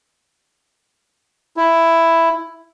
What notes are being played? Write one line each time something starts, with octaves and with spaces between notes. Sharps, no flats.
E4